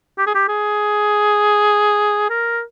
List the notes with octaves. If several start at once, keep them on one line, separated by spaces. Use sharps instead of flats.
G4
G#4
G4
G#4
A#4